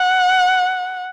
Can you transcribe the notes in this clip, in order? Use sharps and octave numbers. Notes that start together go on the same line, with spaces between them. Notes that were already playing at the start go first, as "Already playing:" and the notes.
Already playing: F#5